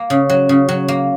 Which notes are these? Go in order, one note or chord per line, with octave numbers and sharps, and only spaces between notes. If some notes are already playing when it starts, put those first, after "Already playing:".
Already playing: A#3
C#3
F#3
C#3
F#3
A#3